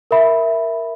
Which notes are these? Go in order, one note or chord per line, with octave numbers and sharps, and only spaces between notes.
A#4 E5 B5